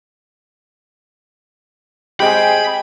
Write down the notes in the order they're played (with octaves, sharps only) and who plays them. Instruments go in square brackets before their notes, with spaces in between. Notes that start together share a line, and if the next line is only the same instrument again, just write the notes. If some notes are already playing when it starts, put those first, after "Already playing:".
[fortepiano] G#3 G4 [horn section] C4 G#4 G5 [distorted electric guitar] B5